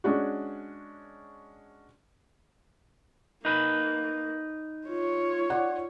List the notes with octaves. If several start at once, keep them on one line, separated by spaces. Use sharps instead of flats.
G#3 C#4 D4 F#4
A#3 D#4 B4
F4 C#5
D5 F#5